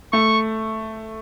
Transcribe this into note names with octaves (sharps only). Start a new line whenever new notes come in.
A3 C#6